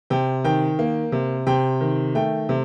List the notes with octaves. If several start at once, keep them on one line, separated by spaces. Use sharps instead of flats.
C3 G5
D#3 G5
A#3
C3
C3 G5
D#3
A3 G5
C3